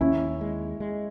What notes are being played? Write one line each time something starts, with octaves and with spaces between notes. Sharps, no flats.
D#2 C#4 E4
G#3
G#3